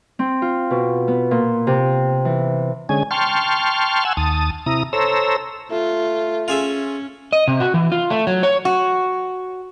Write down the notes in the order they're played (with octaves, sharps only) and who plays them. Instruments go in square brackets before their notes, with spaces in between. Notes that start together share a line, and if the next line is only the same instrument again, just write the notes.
[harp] C4
F4
B2
B3
A#2
C3
E3
[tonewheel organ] D3 G#3 C#4 G#5
G5 A5 C6 C#6 F6
F#5 G#5 E6
D#2 A5 D#6
C3 E4 A#5 D#6
A4 C5 C#5 A#5 E6
[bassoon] A3 [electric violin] F4
[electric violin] C#4 [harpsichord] F4 G#4 E5
[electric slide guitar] D#5
C3
F#4
E3
F4
A3
F#3
C#5
[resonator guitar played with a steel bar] F#4